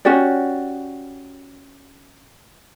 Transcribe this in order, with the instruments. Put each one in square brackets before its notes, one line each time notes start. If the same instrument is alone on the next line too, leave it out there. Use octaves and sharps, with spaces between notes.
[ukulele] C#4 F#4 G4 D5